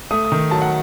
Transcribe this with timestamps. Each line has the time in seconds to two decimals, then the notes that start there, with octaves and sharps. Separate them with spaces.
0.11 A3 D#6
0.25 D#6
0.32 D#3
0.51 F#3 A5
0.62 F#5